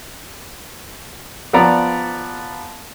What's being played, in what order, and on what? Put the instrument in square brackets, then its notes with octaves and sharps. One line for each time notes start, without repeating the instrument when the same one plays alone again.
[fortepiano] F3 B3 D5 A#5